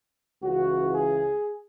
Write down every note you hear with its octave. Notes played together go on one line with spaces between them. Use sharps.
C#2 C#3 E3 F#4
G#4